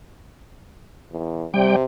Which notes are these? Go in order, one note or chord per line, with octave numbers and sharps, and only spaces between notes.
E2
C3 G3 G5